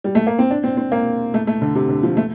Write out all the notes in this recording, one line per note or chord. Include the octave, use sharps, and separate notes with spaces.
G3
A3
A#3
C4
D4
C4
C4
A#3
A3
A3
D3
C3
D3
F3
A3